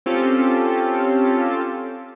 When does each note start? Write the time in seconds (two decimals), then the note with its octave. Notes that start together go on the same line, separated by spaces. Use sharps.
0.06 C4 C#4 F4 G4 A4